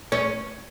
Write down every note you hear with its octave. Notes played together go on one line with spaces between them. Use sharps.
C#4